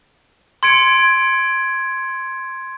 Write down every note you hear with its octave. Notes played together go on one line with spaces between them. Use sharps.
C6 G#6 C#7 D7